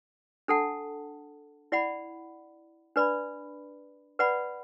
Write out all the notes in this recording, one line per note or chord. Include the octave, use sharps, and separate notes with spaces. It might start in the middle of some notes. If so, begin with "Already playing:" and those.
D4 A4 F#5 A5
E4 D5 F#5 B5
D4 B4 D5 B5
B4 D5 F#5 B5